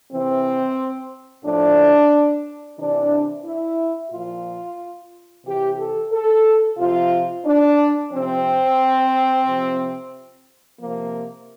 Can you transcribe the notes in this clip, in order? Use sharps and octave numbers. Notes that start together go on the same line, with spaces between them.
C3 E3 C4
A2 F3 D4
C3 E3 D4
E4
A#2 F3 F4
C3 E3 G4
A4
A4
C3 F3 F4
D4
C3 F3 C4
C3 F3
C3 F3 A#3